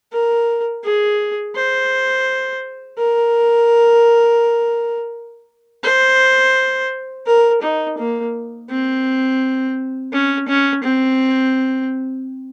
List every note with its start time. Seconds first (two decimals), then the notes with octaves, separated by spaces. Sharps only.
0.12 A#4
0.84 G#4
1.55 C5
2.98 A#4
5.83 C5
7.26 A#4
7.62 D#4
7.98 A#3
8.70 C4
10.13 C#4
10.48 C#4
10.83 C4